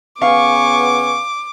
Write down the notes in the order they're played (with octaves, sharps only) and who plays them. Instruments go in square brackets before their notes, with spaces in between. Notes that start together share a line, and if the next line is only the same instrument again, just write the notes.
[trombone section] C#3 B3 [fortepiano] F5 [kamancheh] G#5 C#6 [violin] D6